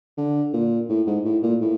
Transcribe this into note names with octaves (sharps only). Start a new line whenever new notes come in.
D3
A#2
A2
G#2
A2
A#2
A2